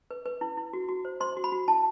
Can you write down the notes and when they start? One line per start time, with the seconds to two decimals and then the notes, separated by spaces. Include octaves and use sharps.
0.11 B4
0.26 B4
0.41 E4
0.57 E4
0.73 F#4
0.88 F#4
1.05 C5
1.20 C5 C6
1.37 F#4
1.44 B5
1.52 F#4
1.68 E4 A5